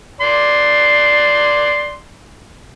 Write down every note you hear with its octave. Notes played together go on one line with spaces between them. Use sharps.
D5 C6